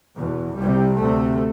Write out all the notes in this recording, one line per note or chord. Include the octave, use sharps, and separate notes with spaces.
E2 B2
C2 C3 G3
D2 C3 A3